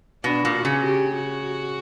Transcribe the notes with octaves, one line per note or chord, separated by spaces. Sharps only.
B2 D4
A#2
F#4
C#3
G4
F#4